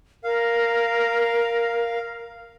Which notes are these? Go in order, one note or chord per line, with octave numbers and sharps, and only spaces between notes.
A#4 F5